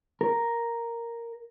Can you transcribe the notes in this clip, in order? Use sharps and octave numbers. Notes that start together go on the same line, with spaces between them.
A#4